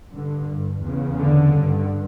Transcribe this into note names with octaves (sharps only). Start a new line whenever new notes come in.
G2 D3
E2 C#3
D3
G2